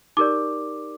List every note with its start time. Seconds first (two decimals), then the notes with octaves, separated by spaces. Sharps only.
0.17 D#4 G4 A#4 D5 D6